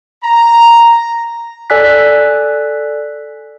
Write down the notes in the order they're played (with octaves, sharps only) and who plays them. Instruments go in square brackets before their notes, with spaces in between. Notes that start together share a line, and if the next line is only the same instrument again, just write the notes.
[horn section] A#5
[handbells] A4 D5 G#5 E6 F#6 B6